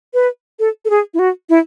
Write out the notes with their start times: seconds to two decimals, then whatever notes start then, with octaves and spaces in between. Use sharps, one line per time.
0.14 B4
0.59 A4
0.85 A4
0.90 G#4
1.14 E4
1.19 F#4
1.49 E4